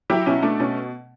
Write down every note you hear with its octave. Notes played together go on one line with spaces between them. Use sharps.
F#3 E4 G4
B2 C#4 E4
A3 D4
B2 C#4